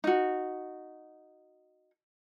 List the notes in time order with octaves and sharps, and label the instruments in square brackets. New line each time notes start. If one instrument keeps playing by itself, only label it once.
[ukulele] D#4 F#4